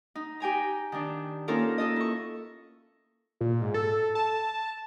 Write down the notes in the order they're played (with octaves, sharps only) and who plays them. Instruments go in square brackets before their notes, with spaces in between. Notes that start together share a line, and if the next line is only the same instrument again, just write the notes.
[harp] D#4
G4 G5 G#5 A#5
D#3 D4
A#3 C#4 D#4 F4 A4 A#4
D#4 A4 D#5
E4 C#6
[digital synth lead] A#2
G#2
A4
A5